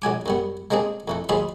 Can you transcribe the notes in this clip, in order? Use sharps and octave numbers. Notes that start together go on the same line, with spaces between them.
A#1 F#3 G#5 D6
F#2 G3 B3
G#3 A#3 C4 D4 G#4
F2 E3 A3
D2 G#2 F3 G#4 B5 C6